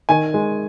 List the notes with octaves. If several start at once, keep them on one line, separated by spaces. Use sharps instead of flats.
D#3 G#5
G#3